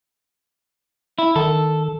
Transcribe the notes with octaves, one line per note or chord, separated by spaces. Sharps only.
E4
D#3 A4